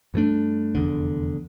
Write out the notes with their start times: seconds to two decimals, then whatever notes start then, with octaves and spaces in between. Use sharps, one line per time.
0.14 G2 E3 A3 D4
0.75 F1 E2 D3